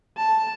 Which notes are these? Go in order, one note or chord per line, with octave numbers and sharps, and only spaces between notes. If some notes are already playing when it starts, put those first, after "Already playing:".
A5